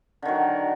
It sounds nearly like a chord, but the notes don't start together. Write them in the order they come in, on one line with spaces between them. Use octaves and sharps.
D3 D#3 F#3